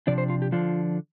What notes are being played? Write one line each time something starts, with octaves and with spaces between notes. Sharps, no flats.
C3 F3 D4 D5
C5
F4
G4
D3 F3 D4 F4